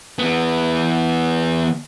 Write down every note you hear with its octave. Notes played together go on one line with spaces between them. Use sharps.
E3 B3